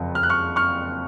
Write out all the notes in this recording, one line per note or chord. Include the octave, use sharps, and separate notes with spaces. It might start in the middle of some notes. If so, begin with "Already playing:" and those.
Already playing: F#1 F2 F3
F6
F#6
C#6 F6
C#6 F6